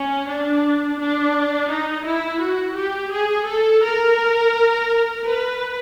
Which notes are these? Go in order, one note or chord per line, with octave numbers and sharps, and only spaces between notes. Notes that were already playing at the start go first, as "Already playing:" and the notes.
Already playing: C#4
D4
D4
D#4
E4
F#4
G4
G#4
A4
A#4
B4